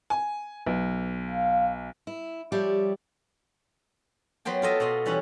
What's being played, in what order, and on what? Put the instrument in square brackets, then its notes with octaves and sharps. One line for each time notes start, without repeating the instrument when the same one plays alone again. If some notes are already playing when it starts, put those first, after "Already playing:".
[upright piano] G#5
B1
[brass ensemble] F5
[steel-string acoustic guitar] E4
F3 G3 G4 C#5 D5 E5
[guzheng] F#3 B3 C5 G5 A5
F4 A4 D#5 E5
B2 F4 D#5 C6
E3 G3 C#4 E4 F#5 A5